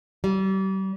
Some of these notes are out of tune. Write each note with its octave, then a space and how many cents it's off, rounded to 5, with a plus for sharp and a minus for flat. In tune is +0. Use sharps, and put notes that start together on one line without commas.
G3 -35